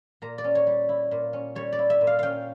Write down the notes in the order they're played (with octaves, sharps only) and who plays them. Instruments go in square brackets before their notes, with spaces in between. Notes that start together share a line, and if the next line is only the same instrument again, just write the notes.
[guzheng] A#2 A#5
D5
C#4
C#5
G3
E4
A#2
C#4
G3 C#5
D5
E4
E5
A#2
F5
C#4 F5 G5